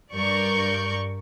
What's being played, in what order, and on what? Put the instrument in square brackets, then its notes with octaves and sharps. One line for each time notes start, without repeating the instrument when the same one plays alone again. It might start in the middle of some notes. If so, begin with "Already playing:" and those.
[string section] G2 A#4 D5 C#6 G6